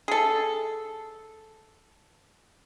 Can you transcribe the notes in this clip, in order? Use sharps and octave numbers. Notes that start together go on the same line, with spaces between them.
G#4 A4